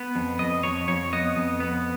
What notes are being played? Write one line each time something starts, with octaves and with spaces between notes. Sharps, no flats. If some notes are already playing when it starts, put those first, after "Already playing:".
Already playing: B3
F2
F2 D#5
F2 C#5
F2 C#5
B3 D#5
F2
B3